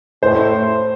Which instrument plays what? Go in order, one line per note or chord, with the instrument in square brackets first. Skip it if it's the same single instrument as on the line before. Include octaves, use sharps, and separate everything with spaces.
[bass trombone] A2 [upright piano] C5